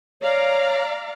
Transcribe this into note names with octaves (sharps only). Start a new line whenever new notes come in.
C#5 D5 F5 A#5